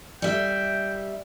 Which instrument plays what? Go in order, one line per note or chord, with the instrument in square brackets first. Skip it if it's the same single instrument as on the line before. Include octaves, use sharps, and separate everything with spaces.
[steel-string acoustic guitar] G3 E5 [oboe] G5